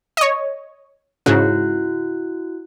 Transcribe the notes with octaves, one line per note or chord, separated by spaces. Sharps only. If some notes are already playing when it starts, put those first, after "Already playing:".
C#5 D#5
G#2 C#3 E4 F#4 F#6